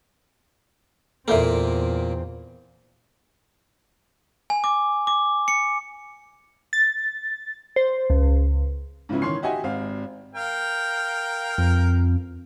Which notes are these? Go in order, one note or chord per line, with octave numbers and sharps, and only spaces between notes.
E2 A#2 A#3 C4 A4 A#4 E5
G#5
D6
D6
C#7
A6
C5
C#2
G#2 C#3 F3 B3 C#4 E4
D#3 E3 C#5 C6 C7
F#4 G4 D#5 E5 F#5 G#5
G#1 C4 F5
A#4 F5 G5
F2